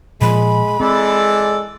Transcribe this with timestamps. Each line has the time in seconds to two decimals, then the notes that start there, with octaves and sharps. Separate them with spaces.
0.21 A#2 F3 G#3 B5
0.80 E3 G#3 C4 A4 D5